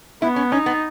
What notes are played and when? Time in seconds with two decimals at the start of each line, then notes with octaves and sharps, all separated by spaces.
0.22 B3 E4
0.36 C#4
0.52 C#4 D#4
0.66 B3